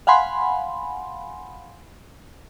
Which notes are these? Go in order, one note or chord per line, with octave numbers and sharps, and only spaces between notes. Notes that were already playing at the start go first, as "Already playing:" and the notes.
F5 F#5 G#5 B5 C6